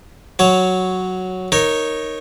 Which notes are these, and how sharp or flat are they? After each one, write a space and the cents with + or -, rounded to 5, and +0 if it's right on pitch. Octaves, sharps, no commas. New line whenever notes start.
F#3 +0 C#5 +0
D#4 +0 A#4 +0 C#5 -10